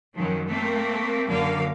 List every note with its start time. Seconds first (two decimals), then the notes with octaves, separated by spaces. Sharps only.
0.15 F#2 D#3 F3
0.47 A3 A#3 C4
1.28 F#2 D3 A#3 F5